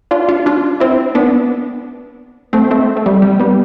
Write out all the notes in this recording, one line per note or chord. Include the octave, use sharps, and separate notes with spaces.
D4 F4
D4 F4
D4 F4
C4 E4
B3 D4
A3 C4
A3 C4
A3
G3
G3
G3 B3